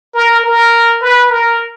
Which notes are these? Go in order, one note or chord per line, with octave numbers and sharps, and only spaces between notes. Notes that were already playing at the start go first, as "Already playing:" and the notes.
A#4
A#4
B4
A#4